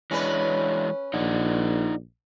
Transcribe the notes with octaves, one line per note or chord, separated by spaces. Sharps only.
E3 G#3 C#4 D4 B4
A#1 D#4 D5 F#5